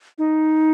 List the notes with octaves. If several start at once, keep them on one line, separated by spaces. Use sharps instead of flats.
D#4